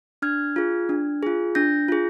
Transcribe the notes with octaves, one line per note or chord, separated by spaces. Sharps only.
D4 F6 G#6
F4 G#4
D4
F4 G#4
D4 G6 A#6
F4 G#4